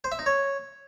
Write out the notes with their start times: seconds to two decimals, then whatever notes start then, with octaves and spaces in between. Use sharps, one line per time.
0.04 C5
0.12 E5
0.19 D#4
0.26 C#5